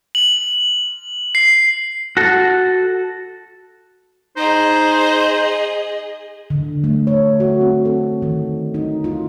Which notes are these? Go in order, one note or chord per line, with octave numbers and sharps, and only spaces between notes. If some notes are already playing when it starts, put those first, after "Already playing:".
F#7
C7
F#4 A4
D#4 G#4 C5 D#5
D3
A3
C#5
F#4
C4
A4
D#3
D#4
F4